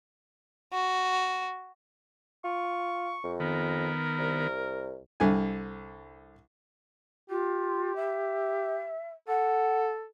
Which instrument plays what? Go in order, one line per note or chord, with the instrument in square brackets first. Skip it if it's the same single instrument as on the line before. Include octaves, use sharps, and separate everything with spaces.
[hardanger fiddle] F#4
[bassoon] F4 [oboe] C#6
[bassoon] F2
[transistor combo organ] D#3 B3 [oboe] A#4
[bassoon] C2
[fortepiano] C2 D3 G#5
[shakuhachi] F4 [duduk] G4
[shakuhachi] E5
[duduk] A4 [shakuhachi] F#5